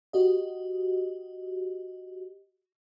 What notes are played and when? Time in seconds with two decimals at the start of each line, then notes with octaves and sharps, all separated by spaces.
0.13 F#4 G4 D#5